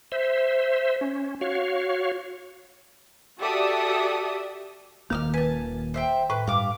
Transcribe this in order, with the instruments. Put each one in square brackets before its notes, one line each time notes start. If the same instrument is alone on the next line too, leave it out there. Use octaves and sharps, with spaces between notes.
[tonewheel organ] C5 E5
C#4
F#4 C#5 F5
[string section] F#4 G4 A4 D5 E5 D#6
[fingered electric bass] D#1 A#3 [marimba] D#3 [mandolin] F5 E6 F6
[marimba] B4 [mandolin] G#5 A5
[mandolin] C5 E5 G5
[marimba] A2 [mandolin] B4
[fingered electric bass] G2 [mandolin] F5 D6